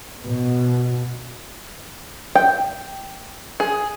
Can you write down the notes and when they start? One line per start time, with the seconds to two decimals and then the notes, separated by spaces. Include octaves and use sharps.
0.25 B2
2.35 G5
3.60 G#4